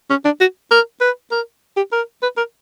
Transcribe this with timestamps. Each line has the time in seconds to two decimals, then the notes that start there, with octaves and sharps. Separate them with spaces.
0.10 C#4
0.25 D4
0.40 F#4
0.71 A#4
1.01 B4
1.31 A#4
1.76 G4
1.92 A#4
2.22 B4
2.37 A#4